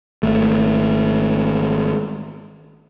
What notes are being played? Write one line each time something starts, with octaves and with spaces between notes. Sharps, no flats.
G#1 A3